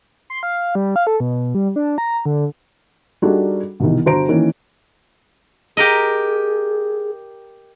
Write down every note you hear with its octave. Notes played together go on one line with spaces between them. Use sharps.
C6
F5
G3
F5
A4
B2
G3
D4
A#5
D3
G3 D4 D#4 F#4 G#4 A4
C2 B2 D#3 E3
G1 F#4 C5 A#5 D7
D#3 E3 A#3 C#4
G4 G#4 A#4 D#5